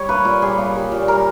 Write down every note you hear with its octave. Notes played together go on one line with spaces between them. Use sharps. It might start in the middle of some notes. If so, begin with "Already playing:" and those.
Already playing: G3 C#5
A#3 B4
A#2
G3 G#4
A#3
G3
A#2
G3 A#4